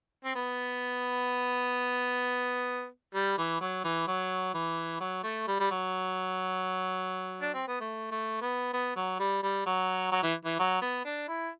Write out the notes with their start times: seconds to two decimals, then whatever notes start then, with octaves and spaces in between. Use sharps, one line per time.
0.25 C4
0.35 B3
3.14 G3
3.38 E3
3.61 F#3
3.84 E3
4.07 F#3
4.54 E3
5.00 F#3
5.24 A3
5.48 G3
5.60 G3
5.71 F#3
7.41 D4
7.54 C4
7.68 B3
7.80 A3
8.11 A3
8.41 B3
8.73 B3
8.96 F#3
9.19 G3
9.43 G3
9.66 F#3
10.12 F#3
10.23 E3
10.45 E3
10.59 F#3
10.81 B3
11.05 D4
11.28 E4